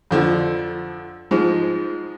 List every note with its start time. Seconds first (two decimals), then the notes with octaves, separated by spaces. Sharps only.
0.11 F2 D3 F3
1.31 G#2 F3 G#3